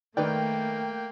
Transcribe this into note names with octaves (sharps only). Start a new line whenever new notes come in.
D#3 A3 A#3 B4 D5 G5